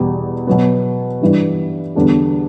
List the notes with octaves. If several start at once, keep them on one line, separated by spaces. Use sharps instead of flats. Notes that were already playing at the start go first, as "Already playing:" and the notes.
Already playing: E2 B2 G3
B2 F#3 B3
G2 E3 G3
E2 D3 G3 D4 A4